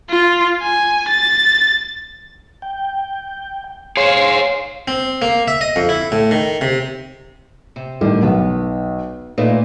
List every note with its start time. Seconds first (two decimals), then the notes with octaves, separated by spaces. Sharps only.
0.10 F4
0.62 G#5
1.08 A6
2.62 G5
3.97 G#4 C5 C#5 F5 C6
4.88 C4
5.22 A#3
5.48 E5
5.61 D#5
5.76 F2
5.89 E4
6.12 A2
6.31 D#3
6.61 C3
7.76 C3
8.01 A2 D3 D#3 G3
8.23 B1 B3
9.38 A#2 A3 D#4 B4